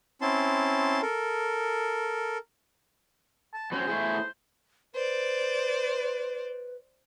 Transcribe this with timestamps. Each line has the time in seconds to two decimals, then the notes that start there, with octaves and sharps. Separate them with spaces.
0.21 C4 C#4 E4 A5 C6
1.02 A4 A#4
3.54 A5
3.72 F#3 C4 C#4 C5
3.87 A3 E4 G#4
4.94 B4 C5 D5